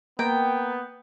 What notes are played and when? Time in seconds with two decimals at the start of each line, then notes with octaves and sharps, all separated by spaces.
0.19 A#3 B3 G5